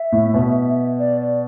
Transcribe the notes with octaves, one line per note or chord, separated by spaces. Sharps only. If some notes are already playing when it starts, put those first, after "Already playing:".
Already playing: E5
A2
B2
D5
D5